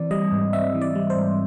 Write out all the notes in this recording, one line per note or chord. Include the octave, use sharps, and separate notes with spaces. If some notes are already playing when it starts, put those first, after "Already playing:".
Already playing: E3 C4 D5
G3 D#5
G#2
C4 E5
E3
D5
G3
C5
G#2